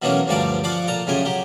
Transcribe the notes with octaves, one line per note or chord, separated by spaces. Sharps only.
B2 E3 F#3 A3 A#3 C#4
D2 G2 F3 G3 A#4 D5
F3 D5 F5 F#5
A#2 A4 A#5
F#2 C#3 A3 G4 G#5
F#3 G4